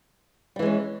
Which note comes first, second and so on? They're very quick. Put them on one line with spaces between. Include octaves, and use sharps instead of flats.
G3 E3 G#3 C#4